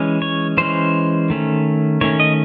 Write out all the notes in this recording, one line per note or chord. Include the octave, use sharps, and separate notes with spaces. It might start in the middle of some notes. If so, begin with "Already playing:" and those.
Already playing: E3 G#3 C#4
C#5
E3 G#3 C#4 C5
D#3 A3 C#4
D#3 A3 C#4 C#5
D#5